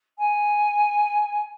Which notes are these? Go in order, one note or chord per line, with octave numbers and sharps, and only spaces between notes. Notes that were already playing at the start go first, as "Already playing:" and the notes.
G#5